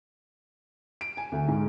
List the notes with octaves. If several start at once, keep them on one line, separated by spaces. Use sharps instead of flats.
D7
G#5
D2
G#2